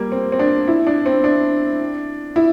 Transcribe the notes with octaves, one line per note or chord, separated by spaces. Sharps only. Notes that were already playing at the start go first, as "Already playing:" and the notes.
Already playing: G3 A#3
C4
C4
D4
E4
D4
C4
D4
E4